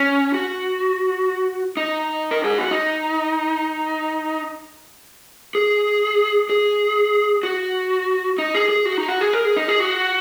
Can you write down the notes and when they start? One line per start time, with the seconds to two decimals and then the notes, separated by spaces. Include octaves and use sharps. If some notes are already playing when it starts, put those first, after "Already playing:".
Already playing: C#4
0.34 F#4
1.77 D#4
2.31 A#4
2.44 G#4
2.58 F#4
2.71 D#4
5.55 G#4
6.50 G#4
7.43 F#4
8.38 D#4
8.55 G#4
8.69 G#4
8.86 F#4
8.98 D#4
9.09 F#4
9.21 G#4
9.33 A#4
9.45 G#4
9.57 D#4
9.68 G#4
9.80 F#4